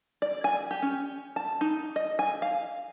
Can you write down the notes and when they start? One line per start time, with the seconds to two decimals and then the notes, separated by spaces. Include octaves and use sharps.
0.22 D5
0.44 G#5
0.71 G4
0.82 C#4
1.36 A5
1.61 D#4
1.96 D#5
2.19 G#5
2.42 F5